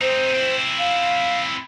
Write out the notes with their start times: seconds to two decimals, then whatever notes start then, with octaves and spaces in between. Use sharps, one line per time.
0.01 C4 D#4 C5
0.34 C4 E4
0.79 F5